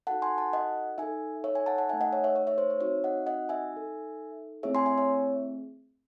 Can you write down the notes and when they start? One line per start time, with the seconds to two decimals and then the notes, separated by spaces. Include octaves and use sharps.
0.07 D#4 F#4 A4 F#5 A5
0.22 G#5 C6
0.38 F#5 A5
0.53 D#5 F#5
0.98 D#4 A4 E5 G#5
1.44 C#5 E5
1.55 E5 G#5
1.66 F#5 A5
1.78 F#5 A5
1.89 A3 D#4 A4 E5 G#5
2.01 D#5 F#5
2.12 C#5 E5
2.24 C#5 E5
2.36 C#5 E5
2.47 C#5 E5
2.58 C5
2.70 C#5
2.81 C4 D#4 F#4 C#5 E5
3.04 D#5 F#5
3.27 D#5 F#5
3.49 E5 G#5
3.73 D#4 A4
4.63 A3 C4 E4 G#4 C#5 E5
4.75 G#5 C6
4.86 E5 G#5
4.98 C#5 E5